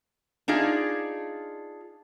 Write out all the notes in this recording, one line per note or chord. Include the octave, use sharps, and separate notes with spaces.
D4 D#4 F4 G#4